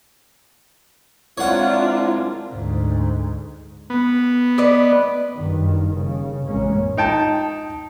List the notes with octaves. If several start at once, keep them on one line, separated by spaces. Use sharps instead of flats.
G#3 C4 D4 E4 F4 A#4 C#5 F#5
D2 G#2
B3
B4 D5 D#5
F#1 G2 D#3
C#3
A1 F#2 A2 G#3 A#3 C#4
D#4 G5 A5